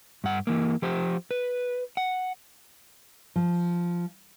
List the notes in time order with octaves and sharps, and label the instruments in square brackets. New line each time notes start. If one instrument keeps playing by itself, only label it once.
[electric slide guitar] G2 F#5
E3 A#3
F3 G4 C5
B4
F#5
[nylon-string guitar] F3